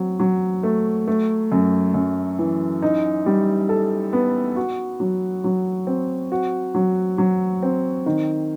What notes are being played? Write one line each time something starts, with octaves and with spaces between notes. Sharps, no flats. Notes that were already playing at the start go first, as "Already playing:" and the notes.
Already playing: F#3 C4
F#3
A3
A3
F#2
F#2
E3
D#4
G3
A4
B3
F#4
F#3
F#3
C4
F#4
F#3
F#3
C4
D#3